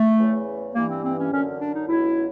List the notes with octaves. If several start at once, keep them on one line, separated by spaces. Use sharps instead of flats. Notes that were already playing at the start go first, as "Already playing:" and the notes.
Already playing: A3
E2 C#3 E3
G2 E3 A#3
C4
C4
C#4
F#2 D3 F#3 C#4
D4
D#4
C#2 B2 F#3 E4